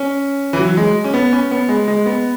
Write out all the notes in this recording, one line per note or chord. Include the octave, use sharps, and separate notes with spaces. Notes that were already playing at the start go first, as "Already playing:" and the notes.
Already playing: C#4
E3
F#3
G#3
C#4
B3
C#4
B3
G#3
G#3
B3